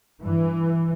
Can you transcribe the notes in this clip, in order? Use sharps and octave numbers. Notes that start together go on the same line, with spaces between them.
G2 E3